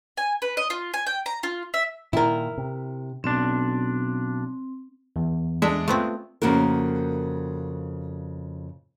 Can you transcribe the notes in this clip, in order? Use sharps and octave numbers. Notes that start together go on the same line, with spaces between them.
G#5
B4
D#5
F4
G#5
G5
A#5
F4
E5
A#2 D#3 E4 A#4
C3
B1 C4 D4
E2
G#3 D4 E5
A3 B3 C4 F4
F2 C#3 A#3 F#4 A#4